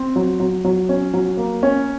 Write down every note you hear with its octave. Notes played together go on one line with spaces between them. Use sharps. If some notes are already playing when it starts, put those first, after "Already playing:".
Already playing: C4
F#3
F#3
F#3
C#4
F#3
A#3
C#4